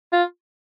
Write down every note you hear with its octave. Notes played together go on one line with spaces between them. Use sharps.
F4